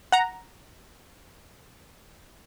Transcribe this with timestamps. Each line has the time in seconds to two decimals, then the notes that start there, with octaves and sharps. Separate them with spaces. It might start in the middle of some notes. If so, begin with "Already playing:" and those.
0.12 F#5 A#5